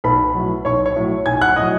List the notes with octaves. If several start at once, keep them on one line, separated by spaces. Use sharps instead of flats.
B1 B4 B5
A2 F#3
B1 C#5 C#6
C#5 C#6
A2 F#3
B1 G#5 G#6
F#5 F#6
A2 F#3 D#5 D#6